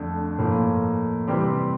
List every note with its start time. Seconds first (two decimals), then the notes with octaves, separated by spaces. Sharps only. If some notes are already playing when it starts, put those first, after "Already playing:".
Already playing: F2 D3 A3 D4
0.38 A2 F3 A#3
1.27 C3 E3 G3 C4 G4